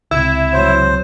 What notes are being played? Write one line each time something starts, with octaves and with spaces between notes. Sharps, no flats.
C#2 C3 E4
F#3 C5